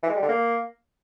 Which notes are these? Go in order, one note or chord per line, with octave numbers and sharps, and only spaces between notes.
E3
G#3
G3
D3
A#3